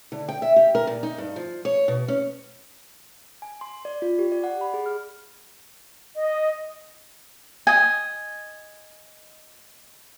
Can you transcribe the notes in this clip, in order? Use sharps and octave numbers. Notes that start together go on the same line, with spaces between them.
D3
G5
E5
G4
A#4
A#2
D#4
G2
F3
C#5
B2
C#4
G#5
C6
D5
F4
G4
D5
F#5
B5
G#4
F6
D#5
D#5 G#5